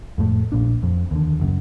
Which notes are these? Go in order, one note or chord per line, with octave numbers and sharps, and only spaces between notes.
F2 A2 A3
A#1 A#2 D4
F2
D#2 D3
F#1 F#2